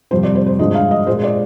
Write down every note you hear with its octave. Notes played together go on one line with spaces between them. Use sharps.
F2 C3 G3 C5
D5
C5
C5
G2 D3 F3 G#3 D#5
F5
D#5
A#2 G#3 C5
D5